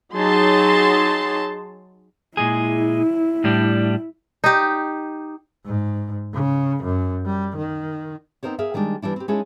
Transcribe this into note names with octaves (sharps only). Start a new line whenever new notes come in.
F#3 D#4 G#4 A5 C6
A#2 G#3 E4 G#4
A2 G3 D4
D#4 G4
G#2
C#3
F#2
G3
D#3
B3 C4 D#4 A#4 C5 C#5
G#4 A#4 E5 F5
D#3 G3 G#3 D4
E3 G3 D4 E4
C4 G4
G#3 C#4 D#4 E4 G#4 A4